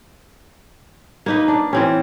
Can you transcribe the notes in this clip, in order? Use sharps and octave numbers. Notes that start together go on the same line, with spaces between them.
A#3 D#4 B4
D4
E3 C4 C#4